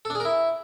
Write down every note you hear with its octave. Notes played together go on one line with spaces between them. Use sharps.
A4
D4
G#4
A#4
E4